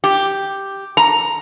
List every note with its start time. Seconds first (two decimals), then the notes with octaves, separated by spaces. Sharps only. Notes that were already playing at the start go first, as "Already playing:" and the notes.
0.04 G4
0.97 A#5